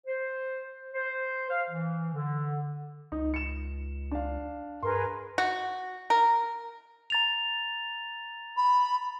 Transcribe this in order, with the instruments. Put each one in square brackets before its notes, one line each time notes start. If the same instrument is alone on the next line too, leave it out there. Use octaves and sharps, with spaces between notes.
[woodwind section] C5
C5
F5
E3
D3
[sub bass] C#2 [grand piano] D#4
[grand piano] C#7 E7
D4 F5
[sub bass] G2 [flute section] G#4 A#4 B4 [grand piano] C6
[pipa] F#4
A#4
[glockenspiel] A#5 A6 F7
[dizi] B5